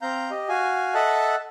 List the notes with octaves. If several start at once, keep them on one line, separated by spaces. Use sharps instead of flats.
C4 F5 A#5 G6
G4 D#5
F#4 F5 G#5
A4 D#5 E5 F#5 A5 F#6